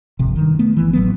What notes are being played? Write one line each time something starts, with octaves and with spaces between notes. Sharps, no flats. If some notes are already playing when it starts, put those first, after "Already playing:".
D#1 G#1 F2 C3
G2 D#3
A3 B3
G1 E3
A1 F#3 B3